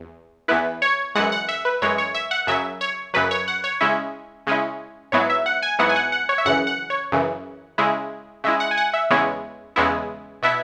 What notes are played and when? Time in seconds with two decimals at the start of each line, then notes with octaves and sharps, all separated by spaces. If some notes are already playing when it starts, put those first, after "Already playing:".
Already playing: E2
0.48 E2 E3 B3 E4 B4
0.82 C#5
1.15 F#2 E3 G#3 F#5
1.32 F#5
1.49 E5
1.65 B4
1.82 F#2 E3 G#3 C#5
1.98 C#5
2.14 E5
2.31 F#5
2.47 F#2 C#3 F#3 E5
2.81 C#5
3.14 F#2 C#3 F#3 B4
3.31 C#5
3.48 F#5
3.64 C#5
3.81 C#3 G#3 C#4 E4 E5
4.47 C#3 G#3 C#4 E4
5.12 G#2 F#3 B3 E4 C#5
5.30 E5
5.46 F#5
5.62 G#5
5.79 G#2 F#3 B3 E4 F#5
5.89 G#5
5.96 F#5
6.12 F#5
6.29 C#5
6.38 E5
6.45 F#2 C#3 E3 F#5
6.67 F#5
6.90 C#5
7.12 F#2 C#3 E3
7.78 C#3 G#3 E4
8.44 C#3 G#3 E4 E5
8.60 F#5
8.71 G#5
8.77 F#5
8.94 E5
9.10 E2 C#3 G#3 B3 E4 C#5
9.76 E2 C#3 G#3 B3 E4
10.42 B2 B3 E4 E5